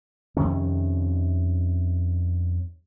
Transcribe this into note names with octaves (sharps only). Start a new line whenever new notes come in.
F2 C3 D#3 C#4